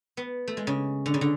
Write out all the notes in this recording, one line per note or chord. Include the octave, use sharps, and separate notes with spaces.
B3
A3
G#3
C#3
D3
C#3
D3